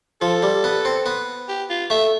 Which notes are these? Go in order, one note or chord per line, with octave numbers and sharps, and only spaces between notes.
F3 A4
G3
B3
C4
B3
G4
F4
A3 E5